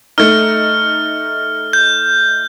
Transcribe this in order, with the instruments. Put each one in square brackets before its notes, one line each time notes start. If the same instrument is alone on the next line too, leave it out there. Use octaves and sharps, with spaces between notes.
[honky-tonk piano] A3 D#4 [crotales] F6
[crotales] G6